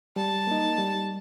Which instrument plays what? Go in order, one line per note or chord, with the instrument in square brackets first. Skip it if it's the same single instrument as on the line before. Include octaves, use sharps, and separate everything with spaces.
[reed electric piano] G3 [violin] A5
[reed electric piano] A#3 D#4
G3